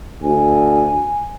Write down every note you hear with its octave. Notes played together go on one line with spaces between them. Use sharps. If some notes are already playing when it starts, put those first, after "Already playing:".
D2 G#5